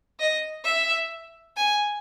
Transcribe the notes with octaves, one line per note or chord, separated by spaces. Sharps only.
D#5
E5
G#5